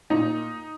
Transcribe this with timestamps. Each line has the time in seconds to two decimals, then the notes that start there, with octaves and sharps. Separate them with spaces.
0.10 A#2 D#4